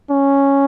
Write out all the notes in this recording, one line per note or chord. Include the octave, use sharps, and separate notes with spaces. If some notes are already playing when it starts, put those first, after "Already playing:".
C#4